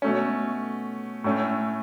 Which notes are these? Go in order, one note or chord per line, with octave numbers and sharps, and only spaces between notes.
B2 A3 C#4
A2 A3 C#4